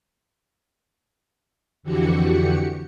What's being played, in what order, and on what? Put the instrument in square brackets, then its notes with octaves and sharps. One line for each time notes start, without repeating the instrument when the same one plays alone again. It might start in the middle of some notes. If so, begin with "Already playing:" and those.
[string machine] F2 D3 E3 F#4 G4 C#7